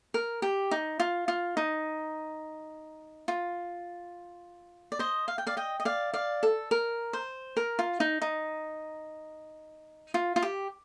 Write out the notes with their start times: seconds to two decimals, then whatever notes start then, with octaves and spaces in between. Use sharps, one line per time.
0.14 A#4
0.42 G4
0.71 D#4
1.00 F4
1.28 F4
1.57 D#4
3.28 F4
4.92 D5
4.99 C5 D#5
5.28 F5
5.38 G5
5.47 D5 F5
5.57 D#5 G5
5.80 D#5
5.85 D5 F5
6.14 D5 F5
6.43 A4
6.71 A#4
7.13 C5
7.57 A#4
7.79 F4
8.00 D#4
8.22 D#4
10.14 F4
10.36 F4
10.42 G4